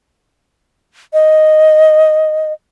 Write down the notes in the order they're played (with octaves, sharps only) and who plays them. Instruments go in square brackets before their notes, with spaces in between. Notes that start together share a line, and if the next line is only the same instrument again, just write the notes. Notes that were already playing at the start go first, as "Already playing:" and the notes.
[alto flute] D#5